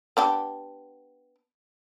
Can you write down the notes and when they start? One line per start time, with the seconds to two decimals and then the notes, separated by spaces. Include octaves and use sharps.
0.17 B3 D4 G4